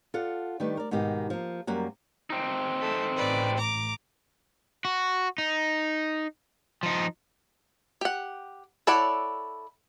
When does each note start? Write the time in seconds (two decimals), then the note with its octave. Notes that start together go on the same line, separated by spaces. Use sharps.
0.14 F4 A4 D5 F#5
0.60 D#3 G3 A3 D4 B4
0.77 A#4 D5
0.91 G#2 B2 D#3 G4
1.30 F3 A#3
1.67 F#2 G3 A#3 F#5
2.30 C4 D#4
2.80 A3
3.16 A1 A2 B4 D5
3.58 A#5 D6
4.85 F#4
5.38 D#4
6.83 F3 D#4
8.01 G4 F#5
8.87 E4 A4 C#5 D5 F#5